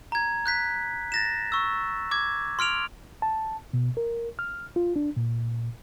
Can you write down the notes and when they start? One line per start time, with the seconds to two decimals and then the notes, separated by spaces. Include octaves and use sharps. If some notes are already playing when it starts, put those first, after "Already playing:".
0.12 A#5 G#6
0.46 F#6 G6 B6
1.12 A6 A#6 E7
1.52 C#6 E6
2.11 D6 G#6
2.59 C6 F6 D7 F7
3.22 A5
3.73 B2
3.97 A#4
4.39 F6
4.76 F4
4.96 D4
5.17 A#2